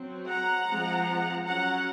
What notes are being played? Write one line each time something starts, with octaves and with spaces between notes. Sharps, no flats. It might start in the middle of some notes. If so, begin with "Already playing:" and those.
Already playing: F#3 C4
F#5 A#5
F3 G#3 C4
F#3 C#4 F#5 A#5